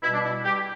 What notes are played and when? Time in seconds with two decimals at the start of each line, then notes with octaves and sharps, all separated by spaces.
0.03 B2 E4
0.07 G3
0.14 D4
0.25 E4
0.45 G4